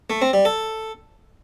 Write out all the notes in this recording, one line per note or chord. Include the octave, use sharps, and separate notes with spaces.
A3
C4
G3
A4